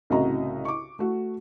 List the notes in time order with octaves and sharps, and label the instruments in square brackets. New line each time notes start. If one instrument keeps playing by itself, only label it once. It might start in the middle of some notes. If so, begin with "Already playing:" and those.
[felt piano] C2 A2 C#3 F#4 D#5 A#5
C#6 D6
A3 F#4